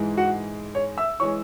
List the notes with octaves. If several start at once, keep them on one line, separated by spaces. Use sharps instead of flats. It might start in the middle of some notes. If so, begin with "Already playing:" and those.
Already playing: G#2 E3 G#3
F#4 F#5
C#5
E5 E6
E3 G#3 C#5 C#6